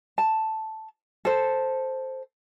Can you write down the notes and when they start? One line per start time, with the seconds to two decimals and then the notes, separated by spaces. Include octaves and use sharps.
0.18 A5
1.25 A4 C5